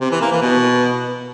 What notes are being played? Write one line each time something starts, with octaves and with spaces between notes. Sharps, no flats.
C3
E3
A#3
E3
B2